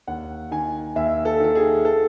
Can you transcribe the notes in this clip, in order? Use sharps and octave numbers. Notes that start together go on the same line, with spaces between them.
D#2 F#5
D#3 G#5
D#2 E5
A4
D#3 A4
G#4
A4